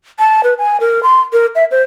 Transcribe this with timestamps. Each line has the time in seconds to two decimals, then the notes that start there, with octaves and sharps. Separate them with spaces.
0.19 A5
0.44 B4
0.59 G#5
0.80 A#4
1.03 C6
1.33 A#4
1.55 E5
1.71 C5